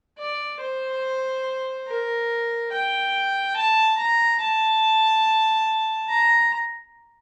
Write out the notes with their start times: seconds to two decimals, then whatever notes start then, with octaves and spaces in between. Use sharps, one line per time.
0.18 D5
0.61 C5
1.87 A#4
2.72 G5
3.56 A5
3.98 A#5
4.41 A5
6.09 A#5